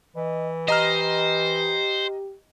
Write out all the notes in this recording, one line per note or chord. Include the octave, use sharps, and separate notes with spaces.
E3 D#5
G4 C5 D#5 A#5 F6